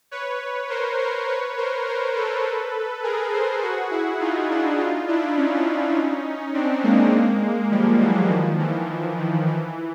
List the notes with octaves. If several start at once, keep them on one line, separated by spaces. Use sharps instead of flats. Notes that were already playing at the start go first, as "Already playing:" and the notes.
B4 C#5
A#4 C5
A#4 C5
B4 C#5
A#4 C5
A#4 C5
A4 B4
G#4 A#4
A#4 C5
F#4 G#4
E4 F#4
D#4 F4
D4 E4
D#4 F4
D4 E4
C#4 D#4
C4 D4
G#3 A#3
F3 G3
E3 F#3
D#3 F3
E3
E3
D#3
E3